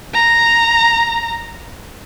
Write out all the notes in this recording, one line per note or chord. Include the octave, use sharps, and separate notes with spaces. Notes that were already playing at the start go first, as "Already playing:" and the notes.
A#5